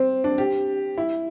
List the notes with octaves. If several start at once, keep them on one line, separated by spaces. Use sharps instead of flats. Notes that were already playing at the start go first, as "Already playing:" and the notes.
Already playing: C4
D4
G4
E4